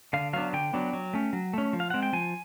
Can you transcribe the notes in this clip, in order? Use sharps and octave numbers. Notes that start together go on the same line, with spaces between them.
D3 F5
F#3 B3 D4 F5
D3 G5
F#3 B3 D4
F#3
A3 C#4
F#3
A3 C#4
F3
F5
G#3 C4 F#5
G5
F3 G#5